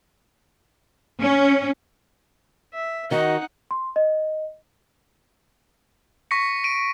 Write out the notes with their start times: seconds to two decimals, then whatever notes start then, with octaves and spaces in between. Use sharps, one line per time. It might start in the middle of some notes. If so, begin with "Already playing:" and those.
1.21 C#4
2.73 E5
3.11 D#3 D#4 F#4 D#5 F#5
3.71 C6
3.96 D#5
6.31 C#6 A#6 B6 C#7
6.64 D7 D#7